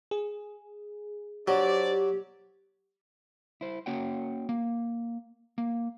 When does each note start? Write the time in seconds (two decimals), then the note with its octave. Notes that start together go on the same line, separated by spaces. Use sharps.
0.11 G#4
1.48 F#3 D4 G4 C5 D5
3.61 E4 C5
3.86 A#3 C#4 F#4 C#5 F#5 G5
4.49 A#3
5.58 A#3